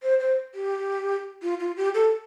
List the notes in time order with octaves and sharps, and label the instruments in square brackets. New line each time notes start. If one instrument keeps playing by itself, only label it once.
[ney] C5
C5
G4
F4
F4
G4
A4